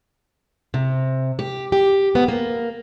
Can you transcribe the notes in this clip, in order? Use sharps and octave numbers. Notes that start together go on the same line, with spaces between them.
C3
G4
G4
B3
A#3